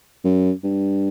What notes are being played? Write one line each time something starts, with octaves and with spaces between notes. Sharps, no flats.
F#2
G2